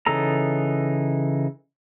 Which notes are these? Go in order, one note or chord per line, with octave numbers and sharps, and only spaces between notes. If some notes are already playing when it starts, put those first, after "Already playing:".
C#3 E3 D#4 A4 A#5